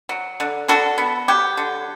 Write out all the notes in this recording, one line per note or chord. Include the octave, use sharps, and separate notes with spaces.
F#3
D3
D4 F#4 A4
B3
F#3 G4
D3